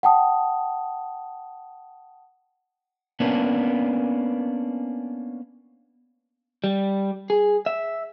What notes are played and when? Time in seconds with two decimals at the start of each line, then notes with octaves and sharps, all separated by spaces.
0.03 F#5 G5 A5 D#6
3.20 A#3 B3 C#4 D4
6.64 G3
7.30 G#4
7.66 E5